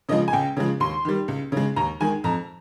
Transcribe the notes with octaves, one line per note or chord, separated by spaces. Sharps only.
C#3 F3 G#3 D#5
G#5
C#2 G5
C#3 F3 G#3
D#2 C6
D#3 G3
C#2
C#3 G#3
D#2 A#5
D#3 G#3 G#5
F2 A#5